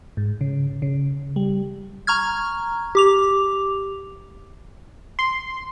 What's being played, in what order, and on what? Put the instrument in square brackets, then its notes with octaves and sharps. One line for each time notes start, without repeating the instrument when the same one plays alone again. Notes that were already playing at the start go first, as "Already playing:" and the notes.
[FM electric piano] G#2
C#3
C#3
G3
[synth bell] A#5 C#6 F6 G#6
G4 D6 F7
[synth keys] C6